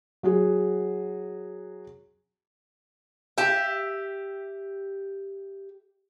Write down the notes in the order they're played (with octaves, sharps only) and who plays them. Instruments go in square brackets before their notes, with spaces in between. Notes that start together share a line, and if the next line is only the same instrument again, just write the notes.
[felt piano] F#3 F#4 G#4
[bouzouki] G4 E5